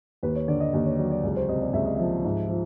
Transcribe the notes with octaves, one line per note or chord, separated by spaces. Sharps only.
D#2 B4
C#5
D3 D5
D#5
D#2 D5
C#5
F#3 D5
D5
C#2
C5
C3 D#5
D5
C#2 E5
D#5
F3 E5
G#2
F3